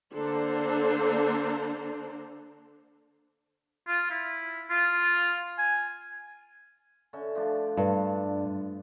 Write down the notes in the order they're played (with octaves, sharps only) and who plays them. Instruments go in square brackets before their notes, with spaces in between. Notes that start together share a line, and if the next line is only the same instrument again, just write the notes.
[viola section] D3 A#3 D4 A4 C5 A#5
[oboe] F4
E4
F4
G#5
[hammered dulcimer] D3 C#4 E5
F3 A3 D4
[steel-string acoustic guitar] G2